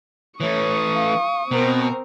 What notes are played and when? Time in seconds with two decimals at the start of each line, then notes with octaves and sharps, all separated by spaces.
0.41 E3 A3 C#5 C#6 D#6
0.94 F5
1.51 B2 C4 A#4 C5